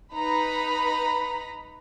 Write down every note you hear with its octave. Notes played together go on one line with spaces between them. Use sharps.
D#4 B4 A#5 B5